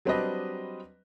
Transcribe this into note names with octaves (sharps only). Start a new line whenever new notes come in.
F#3 G3 C4 D4 B4 D#5